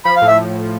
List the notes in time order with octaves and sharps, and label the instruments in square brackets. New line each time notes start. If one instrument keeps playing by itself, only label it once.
[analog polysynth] F3 [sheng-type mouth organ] B5
[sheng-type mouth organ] F5
[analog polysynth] A2
[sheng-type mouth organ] E5